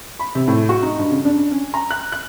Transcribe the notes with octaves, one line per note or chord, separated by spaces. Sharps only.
B5
C3
A2
F#4
D#4
G2
C#3
D4
C#4
A#5
F#6
F#6